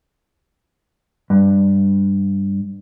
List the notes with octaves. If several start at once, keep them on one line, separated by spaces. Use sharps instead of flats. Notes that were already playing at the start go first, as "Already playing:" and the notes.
G2